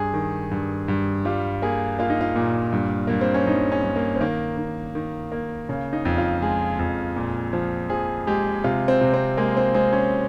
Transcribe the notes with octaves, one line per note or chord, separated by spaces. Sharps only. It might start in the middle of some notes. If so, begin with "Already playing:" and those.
Already playing: G2 G#4
D#3
G2
G2
G3 F4
A#3 G#4
A#3 F4
D#4
F4
A#2
G2
G2 A#3
C4
C#4
G2 D#4
C#4
G2
A#3
C4
D#3 A#3
D#3
D#3
A#3
C#3
D#4
F2
F4
G#3 G#4
F2
A#2
F3
F3 G#4
G#3 G4
C3 F4
C4
C3
C4
G#3 A#3
C4
G#3 C4
C#4